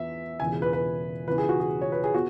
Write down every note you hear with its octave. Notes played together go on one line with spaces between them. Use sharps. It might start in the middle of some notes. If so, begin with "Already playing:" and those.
Already playing: E2 E3 B3 E5
E1 E2 C#3 G#5
G#4
B4
B4
E1 E2 C#3 E3 B4
G#4
F#4
G#4
C#5
B4
G#4
B3 F#4